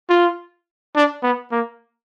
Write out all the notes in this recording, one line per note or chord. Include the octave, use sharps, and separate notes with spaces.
F4
D4
B3
A#3